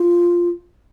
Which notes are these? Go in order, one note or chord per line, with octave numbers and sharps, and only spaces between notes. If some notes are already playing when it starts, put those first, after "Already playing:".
Already playing: F4